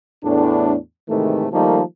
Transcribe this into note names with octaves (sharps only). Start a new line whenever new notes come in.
E2 A2 D4
G#2 C3 D#3 E3 A3
D#3 F3 G3 A3 A#3 D#4